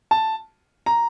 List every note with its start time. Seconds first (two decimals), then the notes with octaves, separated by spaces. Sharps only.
0.11 A5
0.86 A#5